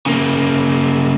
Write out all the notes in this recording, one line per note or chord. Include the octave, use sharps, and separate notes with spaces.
C#3 A#3